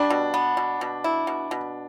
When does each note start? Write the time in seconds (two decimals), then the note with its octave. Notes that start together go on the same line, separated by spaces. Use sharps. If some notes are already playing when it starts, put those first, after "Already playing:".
Already playing: G3 D4
0.10 B2
0.34 B3
0.57 B2
0.81 B2
1.04 E4
1.27 B2
1.51 B2